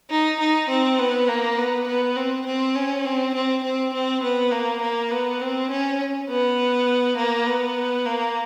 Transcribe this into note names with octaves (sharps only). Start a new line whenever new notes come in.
D#4
D#4
C4
B3
A#3
B3
B3
C4
C4
C#4
C4
C4
C4
C4
B3
A#3
A#3
B3
C4
C#4
B3
A#3
B3
A#3